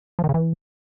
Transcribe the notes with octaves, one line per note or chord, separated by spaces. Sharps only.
F3
D#3
C#3
E3